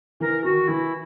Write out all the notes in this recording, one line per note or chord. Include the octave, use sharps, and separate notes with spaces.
E3 A#4
D#3 F#4
E3 E4